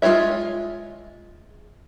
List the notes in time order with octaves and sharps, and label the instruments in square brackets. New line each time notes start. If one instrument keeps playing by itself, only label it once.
[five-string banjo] G#3 F4 C5 C#5 E5